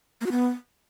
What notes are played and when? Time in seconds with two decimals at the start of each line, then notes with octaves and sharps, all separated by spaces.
0.21 A#3
0.26 F#4
0.31 B3